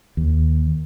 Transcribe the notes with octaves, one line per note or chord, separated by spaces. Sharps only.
D#2